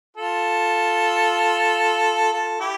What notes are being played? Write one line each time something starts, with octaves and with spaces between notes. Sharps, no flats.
F4 A4
F4 A4
E4 G4